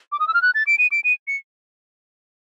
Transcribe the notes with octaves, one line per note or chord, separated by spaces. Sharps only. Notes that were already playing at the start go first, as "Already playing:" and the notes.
D6
D#6
E6
F6
F#6
A6
D7
D#7
D7
D#7
C#7